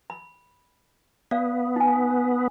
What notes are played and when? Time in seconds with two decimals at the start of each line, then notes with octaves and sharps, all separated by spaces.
0.10 B5
1.31 B3 D5 F5
1.76 D#4 G#5